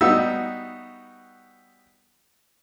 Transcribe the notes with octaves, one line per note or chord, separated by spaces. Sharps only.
G3 B3 D#4 F#4 E5 E6